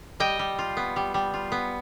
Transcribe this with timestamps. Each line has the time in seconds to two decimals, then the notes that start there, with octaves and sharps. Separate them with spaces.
0.20 G3 D#5 G5
0.39 G3
0.59 F4
0.77 B3
0.96 G3
1.14 G3
1.34 F4
1.52 B3